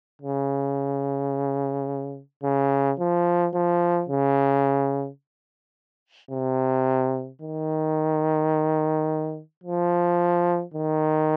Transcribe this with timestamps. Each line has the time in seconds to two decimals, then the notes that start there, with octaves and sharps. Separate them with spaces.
0.22 C#3
2.43 C#3
2.99 F3
3.54 F3
4.09 C#3
6.31 C3
7.42 D#3
9.64 F3
10.74 D#3